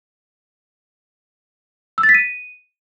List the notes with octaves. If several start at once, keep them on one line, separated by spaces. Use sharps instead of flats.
E6
A6
B6
D#7